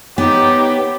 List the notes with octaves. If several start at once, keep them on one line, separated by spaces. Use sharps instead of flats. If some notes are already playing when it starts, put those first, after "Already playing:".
B3 D#4 G4 C#5